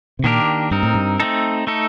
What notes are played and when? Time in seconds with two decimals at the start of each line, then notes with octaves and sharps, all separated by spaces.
0.19 C3
0.24 A#2 D#3 A#3 D4 G4 A#4
0.71 G2 C4 D#4 A#4
0.83 A2
0.94 G2
1.20 A3 C4 D#4 A4
1.67 A3 D#4 A4